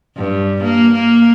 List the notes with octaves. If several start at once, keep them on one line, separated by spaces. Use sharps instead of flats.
G2
A#3
A#3